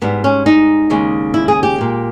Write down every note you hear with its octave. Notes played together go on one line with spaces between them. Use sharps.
G#2 G3 B3
C#4
D#4
D#2 C#3 G#3
E4
G#4
G4
A#2 G#3